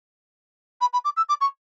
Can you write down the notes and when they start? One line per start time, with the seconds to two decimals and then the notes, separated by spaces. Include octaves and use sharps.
0.81 B5
0.93 B5
1.04 D6
1.17 E6
1.29 D6
1.41 C#6